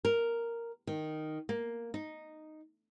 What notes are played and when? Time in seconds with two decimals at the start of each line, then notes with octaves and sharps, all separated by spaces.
0.05 A#4
0.87 D#3
1.49 A#3
1.94 D#4